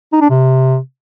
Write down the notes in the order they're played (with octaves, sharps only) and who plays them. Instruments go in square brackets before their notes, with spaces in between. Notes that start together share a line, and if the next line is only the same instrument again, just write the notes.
[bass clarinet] D#4
D4
C3